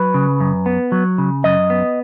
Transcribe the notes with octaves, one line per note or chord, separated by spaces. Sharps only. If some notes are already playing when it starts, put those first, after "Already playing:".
Already playing: F#3 B4
C#3
F#2
B3
F#3
C#3
F#2 D#5
B3